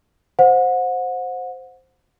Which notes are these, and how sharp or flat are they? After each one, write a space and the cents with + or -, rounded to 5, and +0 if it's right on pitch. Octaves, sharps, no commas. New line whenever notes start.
C5 +0 F#5 -30